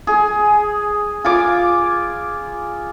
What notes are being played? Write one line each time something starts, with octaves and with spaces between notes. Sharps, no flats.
G#4
F4 G#5 D6